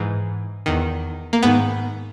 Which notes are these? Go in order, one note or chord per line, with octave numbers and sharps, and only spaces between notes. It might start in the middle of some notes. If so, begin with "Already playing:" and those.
Already playing: G#2 E3
E2 D#3
A#3
G#2 D#3 B3